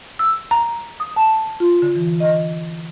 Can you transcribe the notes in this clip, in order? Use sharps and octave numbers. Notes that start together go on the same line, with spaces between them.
E6
A#5
D#6
A5
F4
D3
E3
D#5